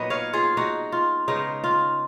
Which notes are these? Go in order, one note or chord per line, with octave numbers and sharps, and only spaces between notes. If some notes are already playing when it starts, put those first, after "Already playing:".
Already playing: A#2 F#3 B3 D#4 B4 D#5
C#5 F5
F4 G#4
D#4 F#4
F4
C#3 G#3 B3 D#4
F4